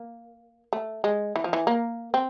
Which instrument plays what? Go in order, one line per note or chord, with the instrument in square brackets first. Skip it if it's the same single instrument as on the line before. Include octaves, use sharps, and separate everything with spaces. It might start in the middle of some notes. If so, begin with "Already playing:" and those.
Already playing: [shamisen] A#3
A3
G#3
E3
F3
E3
A#3
C4